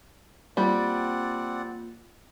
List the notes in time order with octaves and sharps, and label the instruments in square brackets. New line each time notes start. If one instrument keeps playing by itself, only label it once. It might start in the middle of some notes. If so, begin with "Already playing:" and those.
[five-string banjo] G3 [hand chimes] A#3 F4 [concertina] C4 D5 F#5